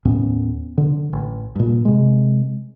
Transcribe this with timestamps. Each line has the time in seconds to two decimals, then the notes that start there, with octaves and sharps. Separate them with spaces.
0.05 D#2 A2 B3 C#4
0.78 D3
1.13 A1
1.56 G2 A#2
1.85 C3 G#3